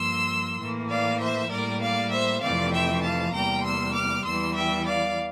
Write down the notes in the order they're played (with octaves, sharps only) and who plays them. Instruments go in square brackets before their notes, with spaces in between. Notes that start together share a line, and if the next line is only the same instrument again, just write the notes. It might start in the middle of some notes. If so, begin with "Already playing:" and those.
Already playing: [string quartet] G2 F3 A#3 C6 E6
A2 E3 A#3
D5 F5
C5 E5
A2 G3 A#3 A#4 D5
D5 F5
C5 E5
F2 C3 E3 A3 C4 D5 F5
E5 G5
F5 A5
E2 C3 G3 A#3 G5 A#5
C6 E6
D6 F6
E2 E3 G3 C6 E6
E5 G5
D5 F5